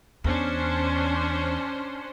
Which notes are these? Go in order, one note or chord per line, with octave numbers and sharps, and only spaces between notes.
E2 C#4 D4 C5